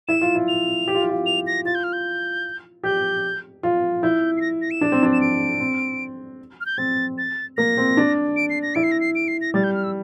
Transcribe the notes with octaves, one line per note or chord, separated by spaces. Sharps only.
E4 E7
F4
E4
F7
G4
F4
E4
F4
F7
A#6
F4 A6
G6
F6
G6
G4 G6
F4
E4 G6
C7
A#6
A#6
E7
D4
C4
D4
E7
D7
C4
F6
G6
C4 A6
A6
A#3 A#6
C4
D4
D7
C7
A#6
E4 D7
C7
A#6
C7
D7
C7
A#6
G3 A6
G6
F6
E6